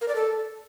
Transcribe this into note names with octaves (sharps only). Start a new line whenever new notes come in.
A#4
D5
A4